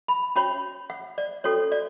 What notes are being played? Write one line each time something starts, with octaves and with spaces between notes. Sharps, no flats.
B5
C#4 F#4 C#5 B5
F#5
D5
C#4 F#4 A4 C#5
D5